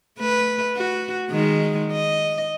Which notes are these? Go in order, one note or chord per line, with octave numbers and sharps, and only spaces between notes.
A3 B4
F#4
D#3 G#3
D#5